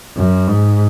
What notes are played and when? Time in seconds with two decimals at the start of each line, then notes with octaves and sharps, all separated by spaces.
0.17 F#2
0.48 G#2